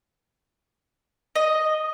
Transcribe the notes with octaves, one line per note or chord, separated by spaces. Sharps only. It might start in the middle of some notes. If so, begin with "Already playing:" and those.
D#5